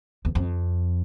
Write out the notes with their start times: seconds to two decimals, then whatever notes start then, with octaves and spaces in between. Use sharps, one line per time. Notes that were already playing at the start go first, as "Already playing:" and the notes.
0.25 E2
0.35 F2